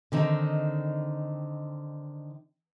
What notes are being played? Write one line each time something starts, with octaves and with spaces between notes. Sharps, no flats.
D3 D#3 C4 D#4